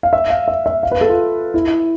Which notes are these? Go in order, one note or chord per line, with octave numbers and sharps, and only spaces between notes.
F5
E5
F5
E5
E5
F5
B4
A4
F4
E4